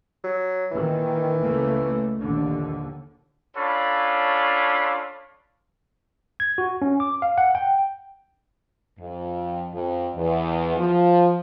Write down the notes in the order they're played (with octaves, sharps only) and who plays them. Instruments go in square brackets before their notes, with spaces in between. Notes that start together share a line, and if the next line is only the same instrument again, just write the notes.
[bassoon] F#3
[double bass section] A#2 D#3 [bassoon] E3
[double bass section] C#2 A3 A#3
A#1 D#2 D3
[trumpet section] C#4 D4 F4 A4 C#5 B5
[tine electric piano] G#6
F#4
C#4
D6
F5
F#5
G5
[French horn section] F2
F2
E2
F3